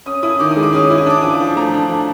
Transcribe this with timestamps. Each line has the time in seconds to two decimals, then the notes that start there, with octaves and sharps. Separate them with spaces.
0.06 C#4 D#6
0.23 E4 D#6
0.39 D#3 D6
0.51 G#3 D#6
0.63 D6
0.73 C#4 D#6
0.87 E4 D6
0.98 D#6
1.06 D4 D6
1.22 F3 D#6
1.34 D6
1.40 F3
1.56 A3 A#5
1.73 D4
1.89 F3